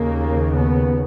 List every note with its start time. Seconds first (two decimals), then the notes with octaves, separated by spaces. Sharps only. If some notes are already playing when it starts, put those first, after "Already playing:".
Already playing: D#2 C#3 A#3
0.53 B3